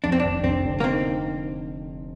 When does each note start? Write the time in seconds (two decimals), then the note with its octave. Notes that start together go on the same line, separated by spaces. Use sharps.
0.04 F2 D4
0.12 C4
0.20 F1 D4
0.43 F1 C4
0.65 D3
0.80 A#3
0.84 C4 D#4